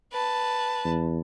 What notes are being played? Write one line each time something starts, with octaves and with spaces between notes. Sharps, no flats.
B4 A5
E2